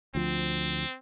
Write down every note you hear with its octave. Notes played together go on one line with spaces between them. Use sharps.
D2 F3 C4